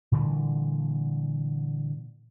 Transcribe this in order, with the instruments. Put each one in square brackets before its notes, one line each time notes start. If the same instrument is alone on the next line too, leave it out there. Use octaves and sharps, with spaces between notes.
[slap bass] A#2 D3 E3 G3